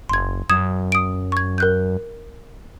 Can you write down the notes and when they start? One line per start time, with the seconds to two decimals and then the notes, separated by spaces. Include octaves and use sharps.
0.09 F#1 C6 G#6
0.50 F#2 D#6 G#6 E7
0.92 D#6 D7
1.32 C#6 G#6
1.58 A#4 F#6 G6